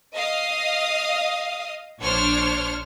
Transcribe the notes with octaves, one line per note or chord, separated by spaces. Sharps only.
D#5 F5 D#6
A#1 D4 C5 C#5 F6